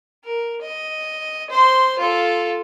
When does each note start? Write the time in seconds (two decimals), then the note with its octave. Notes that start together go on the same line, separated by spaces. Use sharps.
0.24 A#4
0.61 D#5
1.50 C5 C6
1.99 F4 A4